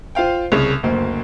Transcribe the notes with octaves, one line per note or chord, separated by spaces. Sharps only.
F4 C5 F5 G5
C2 C#3
F#1 D2 A#3